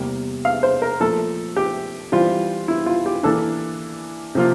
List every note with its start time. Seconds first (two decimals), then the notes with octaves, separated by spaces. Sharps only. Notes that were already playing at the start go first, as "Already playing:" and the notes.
Already playing: E2 C3 G3 A#3
0.45 F5
0.63 C5
0.82 A#4
1.00 A#2 F3 A3 A4
1.56 G4
2.12 E3 G3 C4 F4
2.68 E4
2.86 F4
3.06 G4
3.23 E3 A#3 D4 A4
4.35 C3 F3 A#3 F4